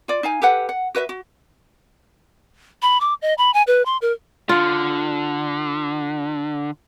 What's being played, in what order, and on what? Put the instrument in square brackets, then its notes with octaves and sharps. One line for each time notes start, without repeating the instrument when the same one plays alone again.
[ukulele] F4 D5
D#4 F5 G#5
G4 A4 B4 F#5
F#5
F#4 B4 D#5 E5
F#4
[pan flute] B5
D6
D#5
B5
G#5
B4
C6
A#4
[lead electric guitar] D3 [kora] F4